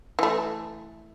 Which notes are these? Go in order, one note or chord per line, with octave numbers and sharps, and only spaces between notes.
E3 A3